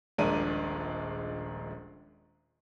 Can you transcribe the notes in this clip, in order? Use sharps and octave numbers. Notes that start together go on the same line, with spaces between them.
D#1 A#1 G#3 D4 A#4 D#7